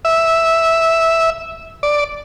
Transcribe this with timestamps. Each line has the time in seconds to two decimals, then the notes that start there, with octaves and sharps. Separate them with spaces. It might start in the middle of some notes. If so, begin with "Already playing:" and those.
0.05 E5
1.83 D5